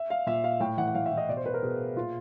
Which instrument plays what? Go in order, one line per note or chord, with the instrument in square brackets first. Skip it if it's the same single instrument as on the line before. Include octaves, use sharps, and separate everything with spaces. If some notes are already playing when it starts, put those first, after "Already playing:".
Already playing: [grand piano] E5
F5
A#2 E5
F5
A2 G5
E3 F#5
F#5
A2 F5
E5
E3
D#5
B2 D5
C5
B4
A#4
B2 G#4
A#2 F4